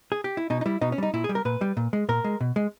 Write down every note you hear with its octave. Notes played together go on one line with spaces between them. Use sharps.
G#4
G4
E4
B2 D#4
D#4
G3 E4
B2 D#4
C#4
G3 D#4
A#2 E4
G#4
G3
A#4
A#2 B4
G3
A#2
G#3
A#2 A#4
G#3
B2
G#3